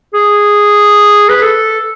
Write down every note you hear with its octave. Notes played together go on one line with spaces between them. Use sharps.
G#4
B4
A4